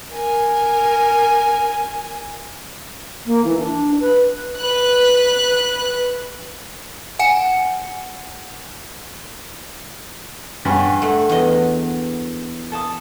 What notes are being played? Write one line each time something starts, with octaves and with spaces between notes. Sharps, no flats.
A#4 G#5
A#3
E3
D4
B4
B4 F#6
F#5 G#5 C#7
G2 G#4 C#5 F#5
A3 F#5
E2 D#5
A4 A5 D#6